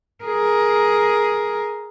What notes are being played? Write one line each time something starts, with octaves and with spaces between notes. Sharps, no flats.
G#4 A#4